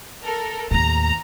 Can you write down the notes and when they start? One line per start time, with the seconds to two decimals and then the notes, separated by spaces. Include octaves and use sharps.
0.24 A4 A#4
0.71 D#2 A2 A#5